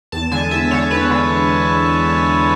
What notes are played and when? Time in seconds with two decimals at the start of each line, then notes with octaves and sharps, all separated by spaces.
0.12 E2 A5
0.31 D3 G#3 G#5
0.51 E2 E5
0.71 D3 G#3 C#5
0.91 E2 B4
1.10 D3 G#3